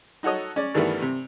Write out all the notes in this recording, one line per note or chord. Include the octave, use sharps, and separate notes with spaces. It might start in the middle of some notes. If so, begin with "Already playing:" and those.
D#4 F#4 A4 C#5 D#5
C#4 D5
G2 D#3 E3 G3 A3 B3
C3